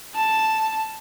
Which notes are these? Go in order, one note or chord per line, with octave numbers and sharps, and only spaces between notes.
A5